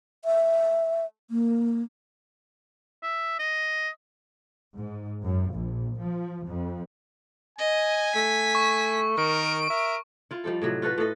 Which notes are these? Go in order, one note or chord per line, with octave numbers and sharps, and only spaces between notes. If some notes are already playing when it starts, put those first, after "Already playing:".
E5
A#3
E5
D#5
G#2
F#2
A#1
F3
F2
D#5 G#5
A3 B6
C#6
D#3 A#4 D7
A#4 E5
E4 F4
F3 G3 D#4 A4
A2 C3 F#3
F4 F#4 A4 B4
A2 F#4 A4 D#5